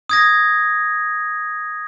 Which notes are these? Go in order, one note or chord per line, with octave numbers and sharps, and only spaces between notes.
D#6 G#6 A#6